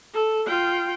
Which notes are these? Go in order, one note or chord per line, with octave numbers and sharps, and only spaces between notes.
A4
F4 G5